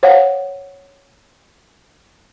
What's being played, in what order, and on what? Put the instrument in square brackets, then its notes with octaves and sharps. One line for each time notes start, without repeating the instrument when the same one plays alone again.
[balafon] C5 C#5 F5 F#5